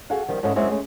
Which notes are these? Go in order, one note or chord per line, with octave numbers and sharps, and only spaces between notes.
F#4 G#4 A4 F5 F#5
D#3 F3 G3
G#2 C#4 E4 A4 D#5
F#2 G#3 C4 E4 C#5 E5
G#3 A3 C#4